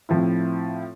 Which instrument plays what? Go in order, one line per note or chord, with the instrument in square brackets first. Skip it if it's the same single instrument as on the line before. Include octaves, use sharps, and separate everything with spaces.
[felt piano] A2 F3 C4 E4